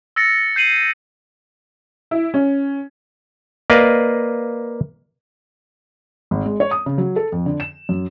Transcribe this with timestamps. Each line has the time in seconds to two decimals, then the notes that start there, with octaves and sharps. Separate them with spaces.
0.16 E6 A6 A#6 C#7
0.56 G6 C7 D#7 F#7
2.11 E4
2.34 C#4
3.70 A#3 B4 D5 D#5 F5
6.31 G#1
6.46 G#3
6.60 C#5
6.71 D#6
6.86 C#3
6.98 F#3
7.16 A4
7.32 F2
7.46 D3
7.60 E7
7.89 F#2